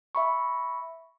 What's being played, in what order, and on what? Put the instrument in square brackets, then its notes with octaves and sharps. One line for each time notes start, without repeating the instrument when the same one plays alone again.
[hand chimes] E5 B5 C#6